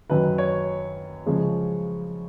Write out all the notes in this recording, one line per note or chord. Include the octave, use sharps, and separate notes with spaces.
F#2 D#3 F#3 B4
C#5
C#3 F3 G#3